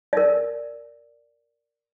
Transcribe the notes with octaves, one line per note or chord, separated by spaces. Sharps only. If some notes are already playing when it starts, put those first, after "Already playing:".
A#4 D5